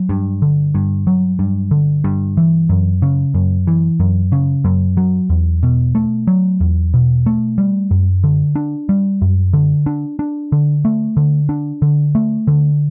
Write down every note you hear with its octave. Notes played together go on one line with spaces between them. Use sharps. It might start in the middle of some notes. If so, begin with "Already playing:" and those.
Already playing: F#3
G2
D3
G2
F#3
G2
D3
G2
E3
F#2
C#3
F#2
E3
F#2
C#3
F#2
F#3
E2
B2
A3
F#3
E2
B2
A3
G3
F#2
D3
D4
G3
F#2
D3
D4
D4
D3
A3
D3
D4
D3
A3
D3